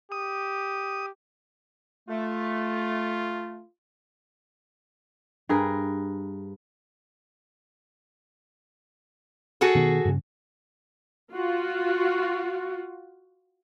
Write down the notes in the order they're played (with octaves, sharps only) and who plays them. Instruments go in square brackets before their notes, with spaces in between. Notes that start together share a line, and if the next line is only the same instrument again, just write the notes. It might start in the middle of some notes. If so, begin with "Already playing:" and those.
[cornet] G4 [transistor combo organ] D#6
[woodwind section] A3 [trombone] F4
[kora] G2 G#4 A#4 B4
[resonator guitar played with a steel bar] F#4 G#4 A4
[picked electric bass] B2 D#3 B3
G2 C#3
[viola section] F4 F#4